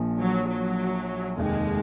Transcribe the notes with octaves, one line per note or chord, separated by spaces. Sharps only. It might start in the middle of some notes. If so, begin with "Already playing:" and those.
Already playing: A#1 A#2 F3
F#3
F#3
F1 D#2 D#3 G#3